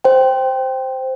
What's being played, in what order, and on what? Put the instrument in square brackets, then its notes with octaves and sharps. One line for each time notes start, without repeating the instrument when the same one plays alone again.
[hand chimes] C5 G5